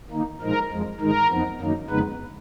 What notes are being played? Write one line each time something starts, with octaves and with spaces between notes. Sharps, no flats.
D#3 A#3 D#4
A#2 F3 G#3 D#4 A#4
F2 F3 G#3
G#2 D#3 G#3 D#4 A#4
F2 F3 B3 D#4
F#2 D#3 F#3 A#3 D#4
F2 C#3 G#3 B3 D#4 B4